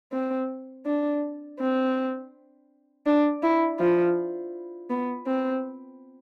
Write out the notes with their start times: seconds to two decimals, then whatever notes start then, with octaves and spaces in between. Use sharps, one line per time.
0.13 C4
0.86 D4
1.60 C4
3.06 D4
3.43 E4
3.79 F3
4.90 B3
5.27 C4